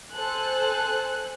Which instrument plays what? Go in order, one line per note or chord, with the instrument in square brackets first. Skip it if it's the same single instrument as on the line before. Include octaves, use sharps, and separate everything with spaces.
[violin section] A4 C5 G#5 F#6